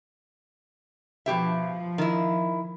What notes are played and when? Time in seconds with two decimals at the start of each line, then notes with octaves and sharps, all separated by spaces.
1.26 B2 F3 G4 E5
1.98 D#3 E4